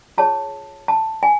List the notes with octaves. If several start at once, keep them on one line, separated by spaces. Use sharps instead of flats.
F4 G#4 C#5 A5
A5
G#5